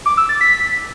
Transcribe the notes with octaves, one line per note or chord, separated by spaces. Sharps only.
D6
E6
A6
B6